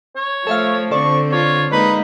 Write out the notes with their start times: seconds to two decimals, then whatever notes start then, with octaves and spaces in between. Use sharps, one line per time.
0.16 C#5
0.47 F3 A3 A4 E5 F5
0.91 D3 C4 A4 D5 C#6
1.32 F4 C#5
1.72 G#3 A#3 D#4 B4